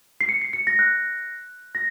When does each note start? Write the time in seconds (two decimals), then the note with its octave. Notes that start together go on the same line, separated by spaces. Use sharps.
0.21 C7
0.29 C#7
0.42 C7
0.53 C#7
0.67 A#6
0.79 F#6
1.75 A#6